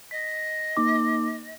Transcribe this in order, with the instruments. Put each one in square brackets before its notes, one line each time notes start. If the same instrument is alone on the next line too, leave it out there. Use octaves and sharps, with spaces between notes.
[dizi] D#5 [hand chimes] B6
[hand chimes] A#3 D#4 D6